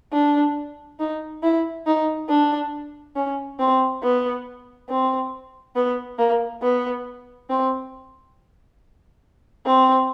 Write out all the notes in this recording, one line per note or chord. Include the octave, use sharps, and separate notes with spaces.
D4
D#4
E4
D#4
D4
C#4
C4
B3
C4
B3
A#3
B3
C4
C4